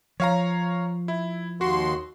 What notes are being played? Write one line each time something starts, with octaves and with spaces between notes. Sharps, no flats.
F3 C#5 F5 A#5
E4
D#2 F#4 C6